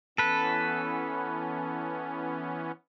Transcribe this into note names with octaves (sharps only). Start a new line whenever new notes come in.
E3 B3 C#4 A4 B4